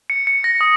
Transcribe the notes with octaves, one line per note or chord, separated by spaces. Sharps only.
C#7
C#7
A#6
D#6